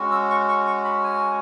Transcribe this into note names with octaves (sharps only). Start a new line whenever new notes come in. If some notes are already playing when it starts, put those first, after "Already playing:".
Already playing: G#3 C#4 F#4
E6
C#6
C#6
C#6
B5
G#5